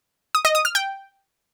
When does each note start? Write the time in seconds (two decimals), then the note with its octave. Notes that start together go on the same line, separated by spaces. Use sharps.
0.35 D#6
0.45 D#5
0.55 D#6
0.65 F6
0.75 G5